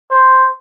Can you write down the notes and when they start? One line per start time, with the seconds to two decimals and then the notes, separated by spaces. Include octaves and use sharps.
0.11 C5